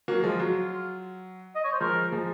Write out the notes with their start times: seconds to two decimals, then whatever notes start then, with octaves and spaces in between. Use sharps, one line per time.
0.08 F#3 A#3
0.23 F3 G#3 F4
0.40 F#3
1.55 D#5
1.64 C#5
1.72 C5
1.80 F3 G#3 A#4
2.11 F3 G#3